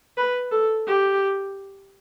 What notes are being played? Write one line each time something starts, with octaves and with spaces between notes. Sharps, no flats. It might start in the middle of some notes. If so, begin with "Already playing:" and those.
B4
A4
G4